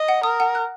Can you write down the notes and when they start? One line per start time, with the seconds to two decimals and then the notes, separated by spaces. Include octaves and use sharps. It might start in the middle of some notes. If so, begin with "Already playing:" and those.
Already playing: D#5
0.09 F#5
0.23 A#4 D#6
0.40 F#5
0.55 F#6